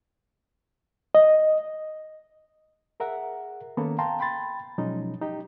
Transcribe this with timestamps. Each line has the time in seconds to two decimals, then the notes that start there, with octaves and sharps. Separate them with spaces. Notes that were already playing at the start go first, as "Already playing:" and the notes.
1.15 D#5
3.00 G#4 A#4 E5 F#5
3.77 D#3 A#3 B3 C#4 A4
3.98 F5 G5 A5 A#5 C6
4.20 G5 B5 C6 A6
4.78 B2 F3 F#3 G#3 C#4 D#4
5.21 D#4 G4